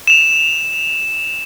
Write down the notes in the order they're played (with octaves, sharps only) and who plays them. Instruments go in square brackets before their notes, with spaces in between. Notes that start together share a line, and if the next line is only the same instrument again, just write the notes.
[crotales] E7 F7